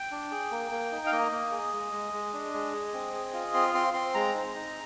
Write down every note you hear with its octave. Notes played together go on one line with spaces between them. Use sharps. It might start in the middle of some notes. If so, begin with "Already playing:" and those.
Already playing: G5
D4
G#4
A#3
A#3
D#4
F5
A#3 D#5
A#3
G#4
G#3
G#3
G#3
D4
G#3
G#4
C4
G#4
F4
C4 C6
C4 C6
C4 C6
G#3 A#5
D#4
D#4